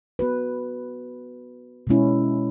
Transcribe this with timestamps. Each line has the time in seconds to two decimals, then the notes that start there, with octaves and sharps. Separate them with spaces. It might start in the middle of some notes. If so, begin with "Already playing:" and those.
0.19 B3 F#4 B4
1.87 B2 G#3 C#4 E4